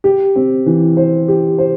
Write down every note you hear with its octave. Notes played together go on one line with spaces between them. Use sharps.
G4
C4
E3
C5
G4
C5